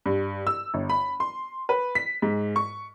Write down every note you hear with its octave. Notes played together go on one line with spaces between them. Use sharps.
G2
E6
G1
B5
C6
B4
B6
G#2
C#6